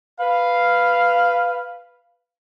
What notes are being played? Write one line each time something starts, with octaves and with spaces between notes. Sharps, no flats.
B4 F5